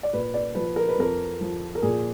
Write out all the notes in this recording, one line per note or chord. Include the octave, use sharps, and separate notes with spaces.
D5
A#2 B4
D5
F3 B4
A#4
B4
F2 A#4
F3
A#4
A#2 G#4